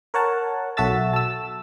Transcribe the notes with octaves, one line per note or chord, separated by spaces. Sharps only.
A#4 C#5 F#5 A5
B1 F#4 A4 E5 E6 A6
A5 E6